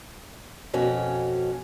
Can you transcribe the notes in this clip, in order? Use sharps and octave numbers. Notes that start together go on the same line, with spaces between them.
F2 B2 C#4 F#4